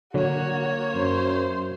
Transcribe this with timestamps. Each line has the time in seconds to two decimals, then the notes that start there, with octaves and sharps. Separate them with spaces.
0.14 D3 F#3 A#3 F#4 C#5
0.95 F#2 C5